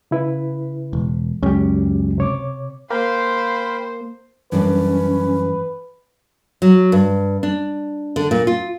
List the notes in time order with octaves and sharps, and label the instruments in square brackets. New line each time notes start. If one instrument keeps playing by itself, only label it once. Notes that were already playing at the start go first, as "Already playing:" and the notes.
[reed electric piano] C#3 E4 B4
[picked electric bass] E1
[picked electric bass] C#2 F#2 [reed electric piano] C#4 G4
[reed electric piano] C3 C#5 D6
[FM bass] A#3 [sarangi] C5 [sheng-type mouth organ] F5 G5 B5
[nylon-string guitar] F#2 G3 D4 [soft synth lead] E3 [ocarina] C#4 [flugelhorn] B4
[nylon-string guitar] F#3
G2
D4
D3
A#2
F4